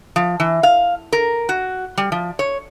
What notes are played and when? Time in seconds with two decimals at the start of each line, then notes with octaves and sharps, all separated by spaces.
0.16 F3
0.40 E3
0.63 F5
1.13 A#4
1.49 F#4
1.98 G3
2.12 F3
2.39 C#5